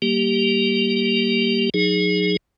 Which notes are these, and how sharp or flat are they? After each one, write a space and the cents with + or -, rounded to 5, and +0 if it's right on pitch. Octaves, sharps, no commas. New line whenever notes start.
G3 -25 A#3 +0 G4 -5
F#3 -40 D#4 +0 G#4 +0